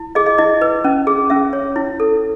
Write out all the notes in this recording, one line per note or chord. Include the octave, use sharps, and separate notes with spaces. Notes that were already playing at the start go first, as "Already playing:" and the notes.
Already playing: E4
G#4 D#5
D#5
E4 D#5
B4
C#4
G#4
C#4 E5
C#5
E4
A4